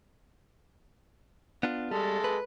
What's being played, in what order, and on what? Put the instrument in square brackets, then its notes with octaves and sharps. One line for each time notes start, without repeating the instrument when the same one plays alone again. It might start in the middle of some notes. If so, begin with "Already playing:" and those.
[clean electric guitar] B3 D4 F4
[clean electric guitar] G3 [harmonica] G#3 A4
[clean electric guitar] B4